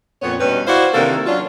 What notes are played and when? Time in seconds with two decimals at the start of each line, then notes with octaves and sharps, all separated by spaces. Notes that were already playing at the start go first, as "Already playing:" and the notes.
0.22 F2 A#2 B3 C#5
0.40 G2 B2 G3 C#4 B4
0.67 E4 F#4 C5 D5 F5
0.94 C3 D#3 E3 A#3 D4 A4
1.26 F#3 C#4 D4 F4